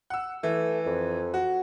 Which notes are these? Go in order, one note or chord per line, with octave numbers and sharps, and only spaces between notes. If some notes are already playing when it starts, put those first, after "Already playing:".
F#5 E6
E3 A3
F2
F#4